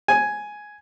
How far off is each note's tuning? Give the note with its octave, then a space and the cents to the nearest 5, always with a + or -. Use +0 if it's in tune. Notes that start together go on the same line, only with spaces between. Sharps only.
G#5 +5